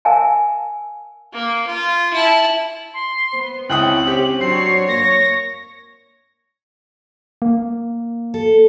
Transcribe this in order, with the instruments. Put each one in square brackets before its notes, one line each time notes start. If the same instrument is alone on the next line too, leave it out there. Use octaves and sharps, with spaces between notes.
[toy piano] A#4 E5 F5 G#5 A5
[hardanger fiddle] A#3
F4
E4 A5
[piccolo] C6
[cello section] B3 [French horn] C5
[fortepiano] C#2 G5 D#6 [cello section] C4 C#4 [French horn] E4 [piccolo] F#7
[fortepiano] G4 [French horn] C5
[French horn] F#3 [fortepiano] C4 [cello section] D4 C#5 [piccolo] C7
[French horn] A#3 [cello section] C#5 [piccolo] A#6
[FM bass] A#3
[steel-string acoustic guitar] A4